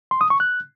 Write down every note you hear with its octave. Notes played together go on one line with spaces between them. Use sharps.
C6
D#6
C#6
F#6